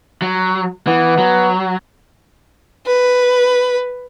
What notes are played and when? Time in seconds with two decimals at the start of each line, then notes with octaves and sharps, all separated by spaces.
0.22 F#3
0.87 E3 B3
1.18 F#3
2.87 B4